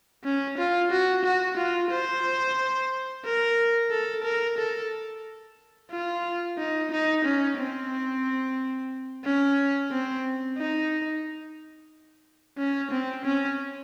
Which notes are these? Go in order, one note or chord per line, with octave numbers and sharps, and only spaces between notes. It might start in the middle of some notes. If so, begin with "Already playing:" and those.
C#4
F4
F#4
F#4
F4
C5
A#4
A4
A#4
A4
F4
D#4
D#4
C#4
C4
C#4
C4
D#4
C#4
C4
C#4